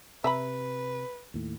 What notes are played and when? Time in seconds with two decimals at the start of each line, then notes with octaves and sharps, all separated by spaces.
0.24 C3 B4 E5 A#5 B5
1.34 D#2 A2